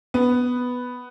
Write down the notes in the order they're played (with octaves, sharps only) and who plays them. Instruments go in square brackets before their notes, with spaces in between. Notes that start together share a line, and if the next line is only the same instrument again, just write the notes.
[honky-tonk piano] B3